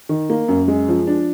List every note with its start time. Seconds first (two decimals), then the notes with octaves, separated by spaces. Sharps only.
0.09 D#3
0.30 A#3
0.48 F#2
0.68 G#3
0.88 F3
1.07 D4